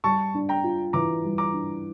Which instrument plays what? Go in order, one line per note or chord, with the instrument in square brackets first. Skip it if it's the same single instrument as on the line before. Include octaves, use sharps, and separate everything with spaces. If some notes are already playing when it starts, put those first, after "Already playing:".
[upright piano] G3 [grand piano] A5 C#6
[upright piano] D4
[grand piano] G5 A#5
[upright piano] F4
[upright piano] E3 [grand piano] A#5 D6
[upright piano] G3
[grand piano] A#5 D6
[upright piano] D4